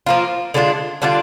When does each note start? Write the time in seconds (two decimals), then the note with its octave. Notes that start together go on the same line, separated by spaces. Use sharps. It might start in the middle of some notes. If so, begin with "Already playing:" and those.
0.06 F3 A#3 F4
0.54 D3 G#3 D4 F4
1.02 D3 G3 D4 F4